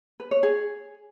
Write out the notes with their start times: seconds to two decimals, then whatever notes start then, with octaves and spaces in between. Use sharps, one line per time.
0.20 B4
0.31 C#5
0.43 G#4